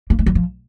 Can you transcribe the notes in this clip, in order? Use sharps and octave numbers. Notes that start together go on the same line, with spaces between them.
A#3
A3
F#3
F3